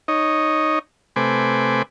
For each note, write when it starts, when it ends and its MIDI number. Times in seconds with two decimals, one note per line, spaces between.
0.08 0.79 63
0.08 0.79 73
0.08 0.79 75
1.16 1.82 48
1.16 1.82 57
1.16 1.82 71
1.16 1.82 72
1.16 1.82 80
1.16 1.82 86